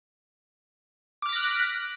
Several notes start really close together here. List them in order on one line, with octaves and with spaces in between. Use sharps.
D6 F6 B6 A#6 F#6